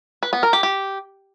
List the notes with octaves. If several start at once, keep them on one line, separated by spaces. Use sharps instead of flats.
B4
B3
A#4
G4
G4